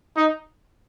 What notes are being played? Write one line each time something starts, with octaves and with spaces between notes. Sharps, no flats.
D#4